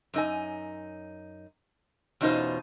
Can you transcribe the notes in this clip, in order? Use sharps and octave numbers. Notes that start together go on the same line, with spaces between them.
F#2 D#4 G#5
E2 B2 C#4 D#4 F4 C5